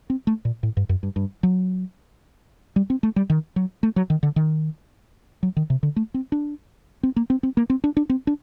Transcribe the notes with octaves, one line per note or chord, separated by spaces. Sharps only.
C4
A3
A#2
A2
G2
F#2
G2
G2
F#3
G3
C4
A3
G3
D#3
F#3
A3
F#3
D#3
D3
D#3
F#3
D#3
C3
D3
A3
C4
D4
C4
A#3
C4
C4
A#3
C4
D4
D4
C4
D4